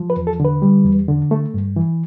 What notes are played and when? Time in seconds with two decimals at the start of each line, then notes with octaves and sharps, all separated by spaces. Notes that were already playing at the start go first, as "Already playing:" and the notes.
Already playing: F3
0.10 B4
0.17 E2
0.27 A4
0.40 D3 B4
0.62 G3
0.85 E2
1.08 D3
1.31 A3
1.54 G2
1.76 E3